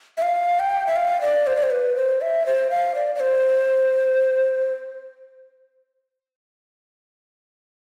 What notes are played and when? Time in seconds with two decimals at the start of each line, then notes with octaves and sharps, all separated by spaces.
0.17 E5
0.22 F5
0.59 G5
0.87 E5
0.96 F5
1.21 D5
1.47 C5
1.56 D5
1.63 C5
1.71 B4
1.96 C5
2.21 E5
2.46 C5
2.70 F5
2.95 D5
3.15 D5
3.20 C5